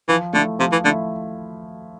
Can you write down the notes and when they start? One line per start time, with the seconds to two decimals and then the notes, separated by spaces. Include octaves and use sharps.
0.08 E3 F3
0.33 D3 A3 E4
0.59 C3 F3
0.72 E3
0.85 D3 A3 E4